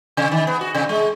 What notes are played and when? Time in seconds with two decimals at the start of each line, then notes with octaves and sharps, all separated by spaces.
0.17 C3
0.31 D#3
0.47 B3
0.61 F#4
0.75 C3
0.89 G#3